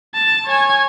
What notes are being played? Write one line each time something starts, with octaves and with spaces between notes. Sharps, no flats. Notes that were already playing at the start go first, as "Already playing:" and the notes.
A5
C#5 G#5